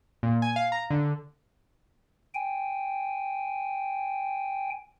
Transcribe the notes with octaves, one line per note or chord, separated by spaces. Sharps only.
A#2
G#5
F5
A#5
D3
G5 G#5